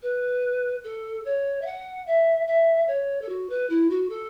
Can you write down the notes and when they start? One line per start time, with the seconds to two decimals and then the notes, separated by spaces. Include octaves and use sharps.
0.02 B4
0.84 A4
1.25 C#5
1.61 E5
1.66 F#5
2.07 E5
2.47 E5
2.88 C#5
3.21 A4
3.28 F#4
3.49 B4
3.69 E4
3.90 F#4
4.09 A4